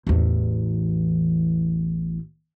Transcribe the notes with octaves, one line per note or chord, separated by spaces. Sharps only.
A1 E2